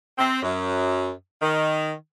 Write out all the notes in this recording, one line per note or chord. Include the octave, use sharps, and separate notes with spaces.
C4
F#2
D#3